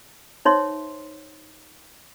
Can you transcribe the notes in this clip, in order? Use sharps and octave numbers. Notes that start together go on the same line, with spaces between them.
D#4 C5 C#5 E5 C6